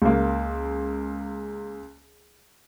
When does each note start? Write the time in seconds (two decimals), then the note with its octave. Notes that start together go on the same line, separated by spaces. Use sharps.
0.02 C#2 A#3